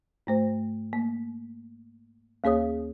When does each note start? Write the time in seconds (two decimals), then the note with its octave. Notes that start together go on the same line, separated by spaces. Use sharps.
0.27 G#2 A3 C5
0.93 A#3
2.44 D#2 A#3 G#4 C#5 D#6